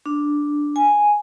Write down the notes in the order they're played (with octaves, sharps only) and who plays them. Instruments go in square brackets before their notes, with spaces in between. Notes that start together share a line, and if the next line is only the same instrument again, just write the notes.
[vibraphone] D4
G#5